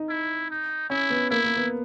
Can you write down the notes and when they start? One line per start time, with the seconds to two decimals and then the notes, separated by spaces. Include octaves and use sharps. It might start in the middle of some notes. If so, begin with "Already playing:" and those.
Already playing: D#4
0.09 E4
0.51 D#4
0.90 C#4 E4
1.10 B3
1.31 A#3 E4
1.44 A#3
1.57 B3